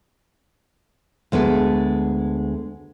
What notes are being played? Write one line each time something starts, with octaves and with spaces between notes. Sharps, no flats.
D2 G#3 B3 A4